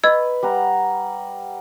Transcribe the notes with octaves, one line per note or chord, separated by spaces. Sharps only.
B4 D#5 C#6 E6 G#6
G3 F#5 A#5